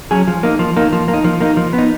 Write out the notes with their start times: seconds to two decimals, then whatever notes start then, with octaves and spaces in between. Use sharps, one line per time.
0.11 F#3 C#4 G#4
0.28 F3
0.43 A#3 D#4
0.59 F3
0.76 A#3 D#4
0.93 F3
1.08 A#3
1.14 D#4
1.24 F3
1.41 A#3 D#4
1.57 F3
1.73 B3
1.78 D#4